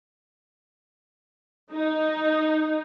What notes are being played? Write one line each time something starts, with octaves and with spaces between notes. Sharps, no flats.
D#4